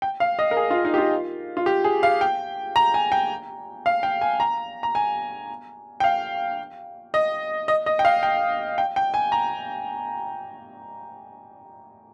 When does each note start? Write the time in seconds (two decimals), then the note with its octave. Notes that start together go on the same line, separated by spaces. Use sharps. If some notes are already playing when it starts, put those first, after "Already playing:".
0.02 G5
0.20 F5
0.39 D#5
0.51 A#4
0.57 G#4
0.71 F4
0.85 D#4
0.94 G4
0.98 F4
1.57 F4
1.66 G4
1.84 G#4
2.03 F5
2.21 G5
2.76 A#5
2.94 G#5
3.12 G5
3.86 F5
4.03 G5
4.21 G#5
4.40 A#5
4.83 A#5
4.95 G#5
6.00 G5
6.04 F5
7.14 D#5
7.68 D#5
7.86 D#5
7.99 G5
8.05 F5
8.23 G5
8.78 G5
8.96 G5
9.14 G#5
9.32 A#5